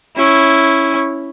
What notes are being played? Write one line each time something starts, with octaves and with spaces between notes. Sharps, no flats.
C#4 E4